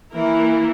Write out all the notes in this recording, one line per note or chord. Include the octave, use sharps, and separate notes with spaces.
E3 A#3 E4 A#4